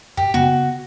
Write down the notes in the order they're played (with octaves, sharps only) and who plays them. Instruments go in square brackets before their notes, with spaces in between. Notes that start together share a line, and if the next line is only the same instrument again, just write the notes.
[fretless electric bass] F#2 [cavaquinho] G4
[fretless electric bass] C#3 B3 [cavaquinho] F#4